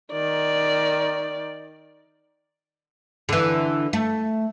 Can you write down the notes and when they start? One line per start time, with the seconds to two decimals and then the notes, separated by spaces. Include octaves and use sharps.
0.12 D#3 D5
3.29 D3 E3
3.93 A3